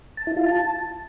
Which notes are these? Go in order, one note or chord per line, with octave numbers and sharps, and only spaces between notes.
A5
E4
F4
A5